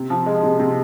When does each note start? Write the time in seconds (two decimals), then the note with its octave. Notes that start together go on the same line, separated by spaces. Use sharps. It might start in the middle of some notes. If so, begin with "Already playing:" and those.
Already playing: C3
0.10 F3
0.26 G#3
0.44 C3
0.60 C3